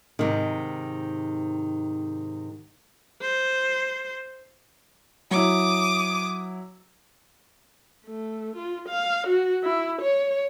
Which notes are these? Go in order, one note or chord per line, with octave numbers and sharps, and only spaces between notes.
G#2 C3 D#3
C5
F#3 E4 D6 D#6
A3
F4
F5
F#4
E4
C#5